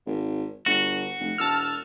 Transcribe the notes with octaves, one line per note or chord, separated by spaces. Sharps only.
G#1
G1 F#4
F1
E1 A5 E6 F6